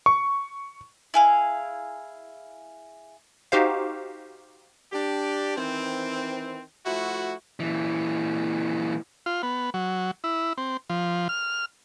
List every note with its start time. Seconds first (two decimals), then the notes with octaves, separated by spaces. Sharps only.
0.06 C#6
1.14 E4 G#4 F5
3.52 D#4 F#4 G4 C5 F5
4.92 D4 G4
5.56 D#3 E3 C4
6.86 F3 A3 E4 F#4
7.60 A#2 E3
9.26 F4
9.43 B3
9.74 F#3
10.24 E4
10.58 C4
10.90 F3
11.29 F6